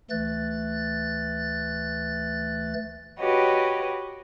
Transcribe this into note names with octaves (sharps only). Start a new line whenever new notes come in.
D2 E3 A3 F#6 A6
F#4 G4 B4 C#5 D#5